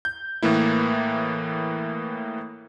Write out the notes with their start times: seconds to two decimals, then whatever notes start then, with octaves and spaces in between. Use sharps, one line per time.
0.05 G6
0.42 A2 E3 A#3 E4